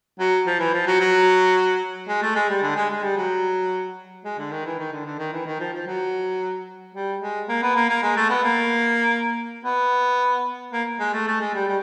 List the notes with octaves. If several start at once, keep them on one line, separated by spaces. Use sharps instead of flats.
F#3
F3
E3
F3
F#3
F#3
G#3
A3
G#3
G3
D3
G#3
G#3
G3
F#3
G#3
D3
D#3
E3
D#3
D3
D3
D#3
E3
D#3
F3
F3
F#3
G3
G#3
A#3
B3
A#3
A#3
G#3
A3
B3
A#3
B3
A#3
G#3
A3
A3
G#3
G3
G3